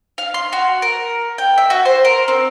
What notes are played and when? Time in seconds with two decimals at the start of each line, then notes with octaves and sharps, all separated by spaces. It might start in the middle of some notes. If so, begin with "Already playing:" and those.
0.18 F5
0.34 C6
0.53 F#4
0.82 A#4
1.38 G5
1.58 E5
1.70 F#4
1.85 C5
2.05 A#4
2.28 C4